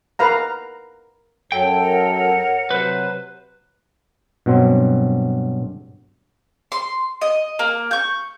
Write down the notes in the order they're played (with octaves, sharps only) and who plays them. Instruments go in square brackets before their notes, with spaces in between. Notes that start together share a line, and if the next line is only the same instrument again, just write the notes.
[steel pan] A#4 B4 F5 A#5
[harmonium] F#2 F#3 A4 [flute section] C#5 [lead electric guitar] G5
[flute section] A#4 C#5 F#5
[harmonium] C3 F#3 [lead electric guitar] B4 C5
[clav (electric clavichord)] G2 B2 F#3 C4
[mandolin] C6
D#5
A#3
C#6 G6